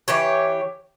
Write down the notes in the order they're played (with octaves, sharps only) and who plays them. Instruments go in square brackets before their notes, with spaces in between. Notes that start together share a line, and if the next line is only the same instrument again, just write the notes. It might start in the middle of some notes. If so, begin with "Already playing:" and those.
[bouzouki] E3 G4 C#5